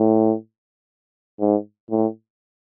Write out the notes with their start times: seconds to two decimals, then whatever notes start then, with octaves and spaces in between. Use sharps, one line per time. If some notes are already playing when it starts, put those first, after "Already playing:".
Already playing: A2
1.40 G#2
1.90 A2